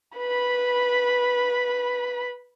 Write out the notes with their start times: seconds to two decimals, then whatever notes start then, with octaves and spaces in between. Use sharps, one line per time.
0.17 B4 B5